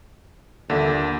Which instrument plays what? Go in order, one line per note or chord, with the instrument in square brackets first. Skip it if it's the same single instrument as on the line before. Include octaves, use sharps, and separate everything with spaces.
[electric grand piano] D#2 E5 [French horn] A#2 [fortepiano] D3